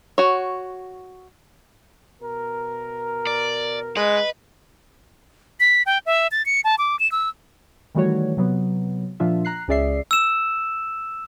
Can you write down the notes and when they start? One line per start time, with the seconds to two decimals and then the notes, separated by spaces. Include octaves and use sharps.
0.18 F#4 C#5
2.22 B2 A#4
3.27 D5
3.97 G#3 B4 D#5
5.60 B6
5.86 G5
6.06 E5
6.31 A6
6.46 C#7
6.64 A5
6.78 D6
6.99 E7
7.12 E6
7.95 D#3 E3 G3 A3 F#4 C#5
8.37 C3 F#3 B3
9.20 A#2 F3 D4 F4 E5
9.45 A#5 F#6 C7
9.68 C#2 C#4 G#4 D5 E5 C7
10.11 E6 E7